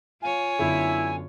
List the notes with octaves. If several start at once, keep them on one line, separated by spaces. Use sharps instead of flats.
F4 C#5 F5 G#5
F#2 D3 B3 E4